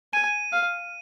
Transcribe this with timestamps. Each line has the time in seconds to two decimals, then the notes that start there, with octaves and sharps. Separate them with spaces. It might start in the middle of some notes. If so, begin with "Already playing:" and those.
0.13 G#5 D#7
0.52 F5